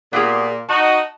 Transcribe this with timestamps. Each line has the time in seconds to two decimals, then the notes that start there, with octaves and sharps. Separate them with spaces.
0.13 A#2 B3 G4 G#4
0.69 D#4 F#4 A5